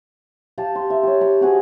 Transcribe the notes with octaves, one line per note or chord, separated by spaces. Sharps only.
G4 F5 A5
C6
E5
G4 C#5
B5 D6
C4 F#4 G#4